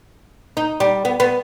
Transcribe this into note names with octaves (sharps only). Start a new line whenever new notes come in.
D#4
G3
B3
B3